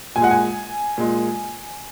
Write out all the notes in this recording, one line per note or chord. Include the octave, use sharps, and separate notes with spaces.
A#2 G#5
G#3 F#5
G#5
A#2 G#3